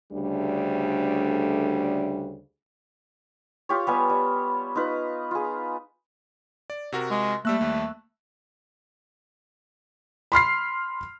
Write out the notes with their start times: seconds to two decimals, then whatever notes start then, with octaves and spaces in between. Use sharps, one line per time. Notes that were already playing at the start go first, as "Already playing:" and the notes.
0.12 D2 C#3 G3 A3 D4
3.69 F4 G4 C#5
3.87 G3 B3 G#5
4.10 G3
4.75 D#4 F4 B4
5.31 F4 G#4
6.70 D5
6.92 C3 F#4 A#4
7.11 G#3
7.45 G3 A3 A#3 E6 F#6
7.61 D#2 G3
10.32 B5 C6 F6 C7